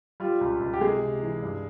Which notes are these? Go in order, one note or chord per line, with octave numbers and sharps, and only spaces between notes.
G3 F4
C#2
C#2
G4
C3 G#3 G#4
C3
E3
G2